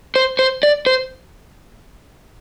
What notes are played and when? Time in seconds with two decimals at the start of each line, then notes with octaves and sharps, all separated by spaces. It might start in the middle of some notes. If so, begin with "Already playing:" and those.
0.16 C5
0.39 C5
0.63 D5
0.86 C5